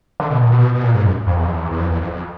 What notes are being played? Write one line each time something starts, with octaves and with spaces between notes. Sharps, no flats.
D3
B2
A#2
B2
B2
A#2
G#2
F#2
F2
E2
F2
E2
E2
F2
E2
F2
F2